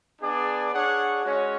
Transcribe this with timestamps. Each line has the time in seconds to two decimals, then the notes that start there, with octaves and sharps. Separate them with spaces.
0.22 B3 D4 G#4 D5
0.73 D4 G#4 C#5 F#5
1.24 G#3 C#4 F#4 C#5